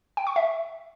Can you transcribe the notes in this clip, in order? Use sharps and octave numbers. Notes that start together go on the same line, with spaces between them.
G5
C#6
E5